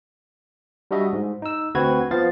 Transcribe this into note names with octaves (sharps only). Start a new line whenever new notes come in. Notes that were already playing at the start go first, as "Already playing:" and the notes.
G3 D4 F#4 D#5 E5
G#2
D#4 E6
D2 C4 F#4 B4 G#6
F3 B3 C5 F5 A6